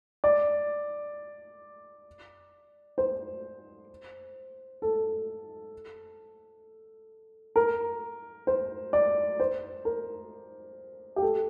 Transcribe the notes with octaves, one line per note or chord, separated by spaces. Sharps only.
D5
C5
A4
A#4
C5
D5
C5
A#4
G4
A4